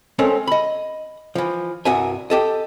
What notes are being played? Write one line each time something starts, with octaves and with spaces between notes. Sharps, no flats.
G#3 C4 C#4 A4 A#4
D#5 B5
E3 F3
C2 G2 F#4 A#4 E5 G#5
G4 A4 D#5